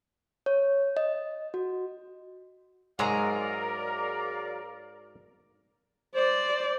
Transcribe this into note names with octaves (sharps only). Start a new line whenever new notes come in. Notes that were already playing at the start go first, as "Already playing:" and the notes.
C#5
D#5
F#4
G#2 F#3 G#3 G#4 A#4 D5 F5 A#5
C5 D5